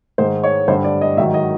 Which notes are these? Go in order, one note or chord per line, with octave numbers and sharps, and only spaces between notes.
G#2 D#3 G#3 C5
C#5
G2 D3 G3 C5
D5
D#5
G#2 D#3 F#3 E5
D#5